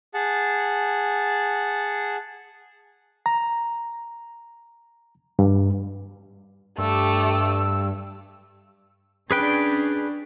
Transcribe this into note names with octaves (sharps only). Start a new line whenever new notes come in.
G#4 F#5 A5
A#5
G2
G2 A3 G4 E6
C#4 D4 G#4 B4 G5